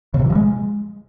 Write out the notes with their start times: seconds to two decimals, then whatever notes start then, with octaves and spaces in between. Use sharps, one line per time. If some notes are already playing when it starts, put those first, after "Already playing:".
0.14 C#3
0.19 C3
0.25 E3
0.30 F3
0.35 G#3